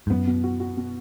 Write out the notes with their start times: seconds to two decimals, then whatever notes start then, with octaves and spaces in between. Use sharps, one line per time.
0.07 G#2
0.10 F#2 B3
0.27 B2
0.44 F#4
0.60 F#4
0.77 B2